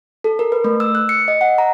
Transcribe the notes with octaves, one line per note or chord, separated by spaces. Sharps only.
A4
A#4
B4
A3
E6
F#6
C#7
D#5
F#5
A#5